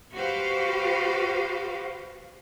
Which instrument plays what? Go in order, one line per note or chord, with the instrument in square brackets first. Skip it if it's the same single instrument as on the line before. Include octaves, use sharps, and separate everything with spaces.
[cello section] F#4 G4 B4 C5 F5